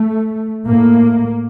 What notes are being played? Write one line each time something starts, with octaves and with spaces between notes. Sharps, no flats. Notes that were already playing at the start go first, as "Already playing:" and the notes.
Already playing: A3
A2 A#3